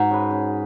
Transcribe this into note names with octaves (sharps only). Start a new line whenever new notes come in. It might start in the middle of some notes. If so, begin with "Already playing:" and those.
Already playing: G#2 F#4
C#4 G#4 B4
C#4